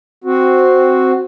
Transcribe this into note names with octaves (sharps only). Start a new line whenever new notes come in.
C4 F#4